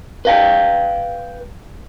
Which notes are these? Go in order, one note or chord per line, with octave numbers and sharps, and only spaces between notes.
B4 F5 G5